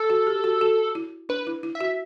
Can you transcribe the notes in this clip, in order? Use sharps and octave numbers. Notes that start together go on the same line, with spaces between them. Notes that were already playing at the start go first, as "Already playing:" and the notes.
Already playing: A4
F#4
G4
F#4
F#4
E4
D4 B4
E4
E4
E5
F#4